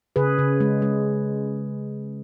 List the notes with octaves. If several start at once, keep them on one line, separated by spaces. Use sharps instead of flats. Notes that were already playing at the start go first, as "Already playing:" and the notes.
C#3 G#4 B4
C#3
G#3
G#3